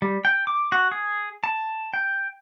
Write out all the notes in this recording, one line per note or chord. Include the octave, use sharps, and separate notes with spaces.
G3
G5
D6
F#4
G#4
A5
G5